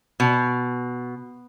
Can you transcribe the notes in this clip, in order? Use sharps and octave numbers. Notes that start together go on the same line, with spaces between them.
B2